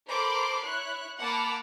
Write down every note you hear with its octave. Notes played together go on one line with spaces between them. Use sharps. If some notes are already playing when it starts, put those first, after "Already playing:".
A4 A#4 C5 B5 C6 D6
E4 C#5 F#6
A#3 F#5 A5 B5 D6 F6